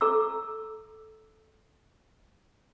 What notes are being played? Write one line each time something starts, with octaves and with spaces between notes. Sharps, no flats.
A4 A#5 D6 E6